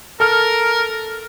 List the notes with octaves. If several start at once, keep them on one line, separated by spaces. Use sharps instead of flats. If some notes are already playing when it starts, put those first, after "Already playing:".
A4 A#4 F6